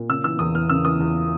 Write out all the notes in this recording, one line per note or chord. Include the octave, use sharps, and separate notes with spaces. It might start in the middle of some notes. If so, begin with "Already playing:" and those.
Already playing: A#2
C#3 E6
E3 E6
E2 D#6
E2 F6
C#3 E6
E3 D#6
E2